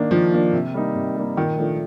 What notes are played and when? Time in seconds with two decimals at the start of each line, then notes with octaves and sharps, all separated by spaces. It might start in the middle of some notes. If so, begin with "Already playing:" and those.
Already playing: D#3 A#3 D4
0.11 D#3 F3
0.32 A#3 D4
0.53 C3
0.74 G3 A#3 D#4
0.95 C3
1.16 G3 A#3 D#4
1.37 A#2 D#3
1.58 F3 A3 D4